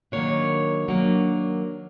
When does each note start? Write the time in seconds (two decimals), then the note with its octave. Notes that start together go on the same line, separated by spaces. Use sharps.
0.12 D#3 F#3 A#3 D4 C#5
0.88 D#3 F#3 A#3 D4